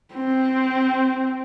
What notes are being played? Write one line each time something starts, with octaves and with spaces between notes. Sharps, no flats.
C4